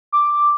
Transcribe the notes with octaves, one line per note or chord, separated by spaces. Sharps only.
D6